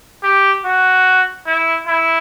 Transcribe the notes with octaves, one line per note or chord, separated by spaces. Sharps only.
G4
F#4
E4
E4